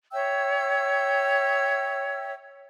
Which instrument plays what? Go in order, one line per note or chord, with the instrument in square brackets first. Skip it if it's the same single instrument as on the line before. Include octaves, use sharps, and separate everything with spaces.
[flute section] C#5 E5 G5 E6